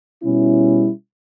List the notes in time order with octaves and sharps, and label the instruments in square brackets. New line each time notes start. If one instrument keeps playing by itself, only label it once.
[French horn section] B2 G3 C#4 E4